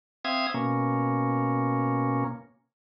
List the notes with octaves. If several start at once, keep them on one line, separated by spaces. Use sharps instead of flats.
C4 E5 F5 D#6 G#6
B2 A#3 C#4